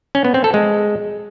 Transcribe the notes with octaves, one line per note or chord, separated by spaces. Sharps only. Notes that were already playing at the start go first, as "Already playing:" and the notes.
C#4
B3
C4
A4
G#3